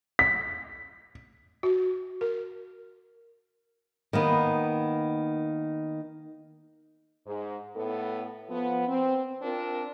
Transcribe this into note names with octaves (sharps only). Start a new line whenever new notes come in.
B6
F#4
A#4
D#3 A#3 B3
G#2
A2 B3 A4
F3 B3
C4
C4 D4 F4 A#4